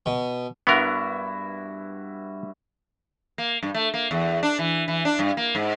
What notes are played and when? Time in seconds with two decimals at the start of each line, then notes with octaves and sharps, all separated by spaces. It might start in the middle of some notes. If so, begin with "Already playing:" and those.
0.06 B2
0.67 G2 B3 E4 F#4 A#4
3.38 A#3
3.63 G2
3.74 A3
3.94 A#3
4.11 E2
4.43 D4
4.59 E3
4.88 E3
5.05 D4
5.19 G2
5.37 A#3
5.55 G#2